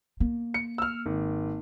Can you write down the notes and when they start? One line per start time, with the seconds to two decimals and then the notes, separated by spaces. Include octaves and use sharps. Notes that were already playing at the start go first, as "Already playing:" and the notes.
0.20 A#3
0.54 C#7
0.78 E6 F6
1.06 G#1